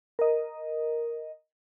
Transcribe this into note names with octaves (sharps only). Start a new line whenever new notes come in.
A#4 D#5